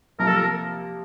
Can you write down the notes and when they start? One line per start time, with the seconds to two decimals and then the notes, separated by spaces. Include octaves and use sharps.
0.19 C3 F3 A#3 A#4
0.27 A4
0.36 A#4